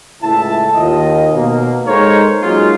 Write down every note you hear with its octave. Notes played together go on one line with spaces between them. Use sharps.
C#2 A2 E4 E5 A5
D#2 F4 D#5
B2 A#3
G#3 D#4 A4 A#4 C5 C#5
F#3 G#3 A#3 C#4 D#4 F4